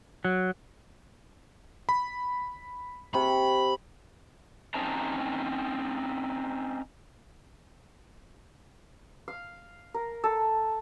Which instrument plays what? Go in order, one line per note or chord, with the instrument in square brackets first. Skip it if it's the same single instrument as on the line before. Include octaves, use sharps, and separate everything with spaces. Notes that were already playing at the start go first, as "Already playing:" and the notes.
[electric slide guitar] F#3
[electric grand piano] B5
[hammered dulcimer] C3 C#6 [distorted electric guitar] B5
[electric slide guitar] C4 C#4 D#4 C5 A5 A#5
[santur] F5
A#4
A4